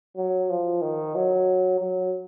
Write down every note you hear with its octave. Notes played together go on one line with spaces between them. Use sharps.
F#3
F3
D#3
F#3
F#3